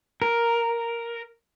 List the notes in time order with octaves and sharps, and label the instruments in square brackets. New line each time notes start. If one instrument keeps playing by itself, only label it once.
[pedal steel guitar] A#4